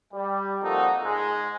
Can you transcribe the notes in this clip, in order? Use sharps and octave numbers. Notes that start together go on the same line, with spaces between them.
G3
F2 A#2 D#4 F#4 A4
G#2 G#3